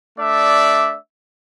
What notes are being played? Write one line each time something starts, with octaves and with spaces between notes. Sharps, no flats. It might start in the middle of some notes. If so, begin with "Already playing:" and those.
A3 D4 D5 E5